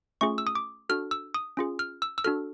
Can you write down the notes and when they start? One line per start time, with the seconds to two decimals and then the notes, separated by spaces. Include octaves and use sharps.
0.21 A3 C#4 F4 G#4 C#6
0.38 E6
0.47 D#6
0.55 D6
0.89 D4 F#4 A4 F6
1.11 E6
1.34 D#6
1.57 C#4 F4 G#4
1.79 F6
2.02 E6
2.18 E6
2.24 D4 F#4 A4 F6